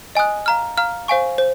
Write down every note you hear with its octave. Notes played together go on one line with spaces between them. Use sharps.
D#5 G#5 D#6 F#6
F5 A#5 F6
F5 A#5 F6
C5 F5 G#5 C#6
C5